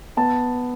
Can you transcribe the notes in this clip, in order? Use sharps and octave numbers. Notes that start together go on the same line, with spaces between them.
B3 A5